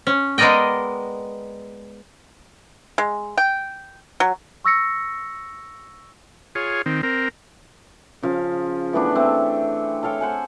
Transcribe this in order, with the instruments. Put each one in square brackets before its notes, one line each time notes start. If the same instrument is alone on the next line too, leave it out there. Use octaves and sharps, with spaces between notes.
[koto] C#4
G#3 B3 A#4 D5 D#5 G5
[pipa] G#3
G5
F#3
[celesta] C#6 E6 A#6 C#7
[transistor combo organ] F4 G#4 C#5
D#3 C4
C4 A#4
[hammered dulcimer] C#3 F3 F5
E3 A3 B3 D4
A3 C4
A4 C#5 F5 G5
C5 F#5 G#5